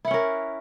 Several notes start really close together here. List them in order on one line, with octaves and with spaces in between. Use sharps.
E4 F#5 C#4 A#4